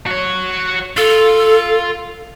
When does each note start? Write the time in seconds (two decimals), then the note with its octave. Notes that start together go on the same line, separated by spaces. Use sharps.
0.06 F#4 C#5
0.97 F4 A4